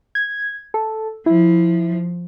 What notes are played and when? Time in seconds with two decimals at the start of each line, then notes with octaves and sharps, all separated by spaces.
0.15 G#6
0.74 A4
1.26 F3 E4